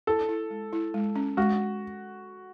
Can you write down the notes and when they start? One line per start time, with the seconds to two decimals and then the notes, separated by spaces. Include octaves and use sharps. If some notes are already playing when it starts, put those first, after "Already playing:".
0.07 E4 A4
0.29 E4
0.51 G#3
0.73 E4
0.94 G#3
1.16 C#4
1.37 G#3 F#4